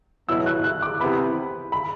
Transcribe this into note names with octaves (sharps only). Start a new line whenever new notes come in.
E2 B2 F#3 B3 E4 E6
F#6
F#6
D6
C3 E3 B3 E4 B5
B5